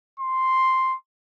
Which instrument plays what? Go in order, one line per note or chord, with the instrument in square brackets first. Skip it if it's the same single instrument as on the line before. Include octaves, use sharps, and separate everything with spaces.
[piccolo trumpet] C6